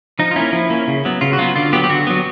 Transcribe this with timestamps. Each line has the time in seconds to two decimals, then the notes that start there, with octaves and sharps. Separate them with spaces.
0.19 F3 D#4
0.31 F4
0.36 A#3 C#4 E4
0.53 F3
0.70 A#3 C#4
0.88 C#3
1.05 F#3 B3
1.21 C#3 F4
1.33 F#4
1.38 F#3 B3 F4
1.56 D3 F4
1.73 F#3 B3 G4
1.84 G4
1.89 D3 F#4
2.07 F#3 B3